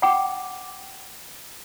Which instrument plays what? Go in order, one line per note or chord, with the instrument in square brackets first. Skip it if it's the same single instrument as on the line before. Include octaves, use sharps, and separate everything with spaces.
[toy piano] F#5 G5 D6